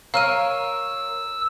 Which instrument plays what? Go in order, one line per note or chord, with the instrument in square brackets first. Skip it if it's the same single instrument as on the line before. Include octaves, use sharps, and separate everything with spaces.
[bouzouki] A#4 C#5 [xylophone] F5 F6 D#7 [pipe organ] E6